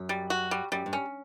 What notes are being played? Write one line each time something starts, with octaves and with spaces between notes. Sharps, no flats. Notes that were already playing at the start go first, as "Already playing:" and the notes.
Already playing: F#2
G3
F#4
G3
F#2 G3
G2
C#4